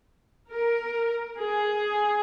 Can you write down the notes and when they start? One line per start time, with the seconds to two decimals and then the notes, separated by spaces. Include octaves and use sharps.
0.50 A#4
1.37 G#4